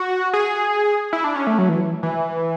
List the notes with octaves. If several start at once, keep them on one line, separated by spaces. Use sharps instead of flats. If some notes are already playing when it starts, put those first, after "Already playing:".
Already playing: F#4
G#4
E4
D4
C#4
A3
F#3
E3
E3